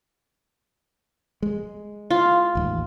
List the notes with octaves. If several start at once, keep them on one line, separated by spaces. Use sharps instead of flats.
G#3
F4
A1 D#2